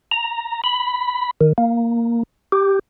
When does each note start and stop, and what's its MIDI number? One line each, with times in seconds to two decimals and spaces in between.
0.11 0.62 82
0.64 1.31 83
1.41 1.53 51
1.58 2.23 58
2.52 2.79 67